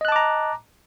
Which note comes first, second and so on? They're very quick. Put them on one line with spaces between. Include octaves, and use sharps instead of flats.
D#5 F#6 A5 D6 A#5